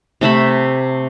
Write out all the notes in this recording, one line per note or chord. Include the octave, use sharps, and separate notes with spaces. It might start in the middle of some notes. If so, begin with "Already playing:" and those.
C3 A3 E5 B5